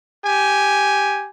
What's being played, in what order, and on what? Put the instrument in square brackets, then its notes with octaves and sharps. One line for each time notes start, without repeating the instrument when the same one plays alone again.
[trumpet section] G4 G#5